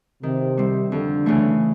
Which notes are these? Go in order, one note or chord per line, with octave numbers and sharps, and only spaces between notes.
C3 D#3
G3 C4
F2 D3
C#3 E3 A3